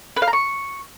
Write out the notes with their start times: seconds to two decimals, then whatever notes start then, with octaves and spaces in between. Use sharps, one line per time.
0.16 B4
0.22 F5
0.27 A#5
0.33 C#6